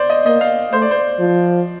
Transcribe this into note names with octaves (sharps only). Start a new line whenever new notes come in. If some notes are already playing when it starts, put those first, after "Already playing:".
Already playing: C5 D5
D#5
A#3 D#5
F5
A3 C5
D5
C5
F3